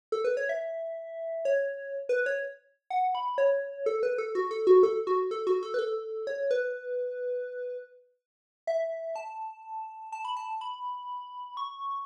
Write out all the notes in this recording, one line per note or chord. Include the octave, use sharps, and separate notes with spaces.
A4
B4
C#5
E5
C#5
B4
C#5
F#5
B5
C#5
A4
B4
A4
F#4
A4
F#4
A4
F#4
A4
F#4
A4
B4
A4
C#5
B4
E5
A5
A5
B5
A5
B5
C#6